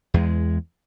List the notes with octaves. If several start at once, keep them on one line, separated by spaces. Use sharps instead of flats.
E2 G#3